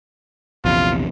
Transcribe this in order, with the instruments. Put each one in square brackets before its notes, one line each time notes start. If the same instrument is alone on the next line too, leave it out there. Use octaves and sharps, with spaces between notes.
[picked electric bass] A#1 E2 C3 [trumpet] F4